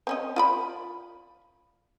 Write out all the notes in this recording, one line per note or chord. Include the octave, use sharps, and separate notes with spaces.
C4 C#4 D#5
F4 D5 B5